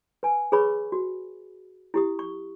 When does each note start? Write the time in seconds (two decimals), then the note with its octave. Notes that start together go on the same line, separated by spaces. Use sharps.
0.23 B4 G#5
0.52 G#4 B4 C#5 B5 C#6
0.92 F#4
1.94 E4 G4 D#6
2.19 C#6